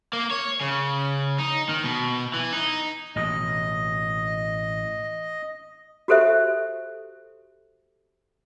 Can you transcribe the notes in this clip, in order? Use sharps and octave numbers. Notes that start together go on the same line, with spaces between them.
A#3
C#5
C#3
D#4
D#3
B2
E3
D#4
A1 B2 D#5
F#4 G4 A4 C5 E5